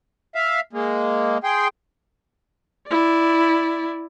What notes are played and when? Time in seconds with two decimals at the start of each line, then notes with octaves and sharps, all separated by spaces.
0.35 E5 F5
0.73 G#3 A#3
1.44 G#4 G5 C6
2.88 E4 D5